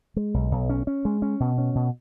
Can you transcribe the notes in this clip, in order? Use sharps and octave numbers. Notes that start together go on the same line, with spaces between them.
G#3
B1
B1
C#4
C#4
G#3
C#4
B2
C#4
B2